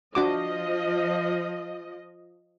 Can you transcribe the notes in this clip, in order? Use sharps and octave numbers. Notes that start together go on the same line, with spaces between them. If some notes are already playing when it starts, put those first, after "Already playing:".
F3 D4 F#4 D#5 D6